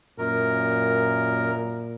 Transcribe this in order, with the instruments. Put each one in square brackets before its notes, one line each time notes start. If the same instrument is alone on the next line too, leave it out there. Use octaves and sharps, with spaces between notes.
[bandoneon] F#2 A#4 [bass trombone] A#2